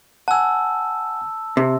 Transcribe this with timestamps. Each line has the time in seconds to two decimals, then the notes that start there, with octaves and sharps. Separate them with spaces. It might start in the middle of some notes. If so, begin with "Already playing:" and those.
0.28 F#5 G#5 A5 E6
1.57 C3